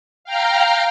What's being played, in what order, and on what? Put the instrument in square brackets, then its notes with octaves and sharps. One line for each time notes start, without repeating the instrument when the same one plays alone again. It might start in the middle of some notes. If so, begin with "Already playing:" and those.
[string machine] F5 G5 A#5 F6